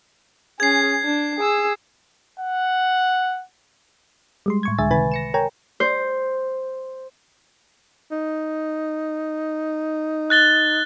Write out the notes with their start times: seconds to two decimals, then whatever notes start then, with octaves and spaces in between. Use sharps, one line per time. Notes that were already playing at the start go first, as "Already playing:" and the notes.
0.60 C#4 G#4 G#6 C7
1.04 D4
1.38 G#4 E6
2.40 F#5
4.46 G3 G#3 C6
4.63 A2 C#6 G#6
4.78 C#2 D3 G#3 E5 G#5 A6
4.91 C3 D#3 B4 G#5 B5 A6
5.12 A#6 C#7 E7
5.34 A#4 C#5 G5 G#5 A#5
5.80 C5
8.12 D#4
10.30 F#6 A6 G7